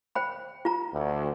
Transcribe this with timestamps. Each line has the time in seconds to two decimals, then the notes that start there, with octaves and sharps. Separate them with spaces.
0.15 C5 G5 B5
0.65 F4 A#5
0.93 D2